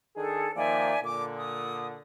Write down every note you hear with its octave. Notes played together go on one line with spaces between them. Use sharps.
D#3 D4 G#4 A4
D#3 F3 A#3 D5 E5 G#5
A#2 D3 D6
D#6